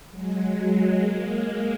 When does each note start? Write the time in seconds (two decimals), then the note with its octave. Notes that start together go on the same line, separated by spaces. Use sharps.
0.10 F#3 G#3
0.39 F#3 G#3
0.96 G#3 A#3